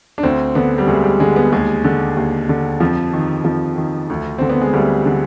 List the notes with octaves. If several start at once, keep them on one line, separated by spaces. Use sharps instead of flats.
D4
D2 C4
D3 B3
G3
D2 G#3
G3
D3 G#3
B3
D#2 G#3
D3
D#2
D3
F2 F3
D#3
F2 F3
D#3
D2
D3 C4
B3
G#3
D2 G3
D3